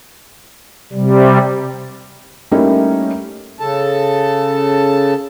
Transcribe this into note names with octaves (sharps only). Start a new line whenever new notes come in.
C3 G3
G3 A3 A#3 C#4 D#4 E4
C#3 A4 A5